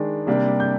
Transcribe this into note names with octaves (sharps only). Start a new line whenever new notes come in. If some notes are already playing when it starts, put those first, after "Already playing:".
Already playing: D#3 G#3 D4
C3 G3 A#3 D4
G6